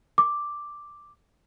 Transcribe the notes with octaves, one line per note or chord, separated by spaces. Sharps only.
D6